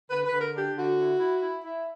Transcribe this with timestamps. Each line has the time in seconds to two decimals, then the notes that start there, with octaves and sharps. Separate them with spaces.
0.11 D3 B4
0.25 B4
0.33 D3
0.40 A#4
0.55 D4 G4
0.76 D3 F#4
0.98 E4
1.20 E4
1.42 E4
1.64 E4